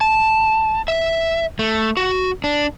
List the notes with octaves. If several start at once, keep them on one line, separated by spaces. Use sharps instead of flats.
A5
E5
A3
F#4
D4